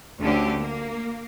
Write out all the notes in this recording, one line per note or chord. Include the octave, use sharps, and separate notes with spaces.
D2 D3 C#4 G4
A#3